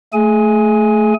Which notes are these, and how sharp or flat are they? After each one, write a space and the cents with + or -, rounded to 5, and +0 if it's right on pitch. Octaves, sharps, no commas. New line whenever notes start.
A3 +0 G#4 +25 G#5 +0